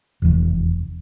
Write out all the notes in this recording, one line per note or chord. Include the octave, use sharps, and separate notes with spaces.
F1 E2